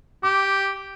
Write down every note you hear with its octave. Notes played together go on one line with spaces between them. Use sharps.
G4 D6